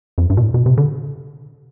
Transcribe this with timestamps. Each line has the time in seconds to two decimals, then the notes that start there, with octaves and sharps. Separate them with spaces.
0.18 F2
0.30 G2
0.37 B2
0.42 A2
0.54 B2
0.66 C3
0.77 D3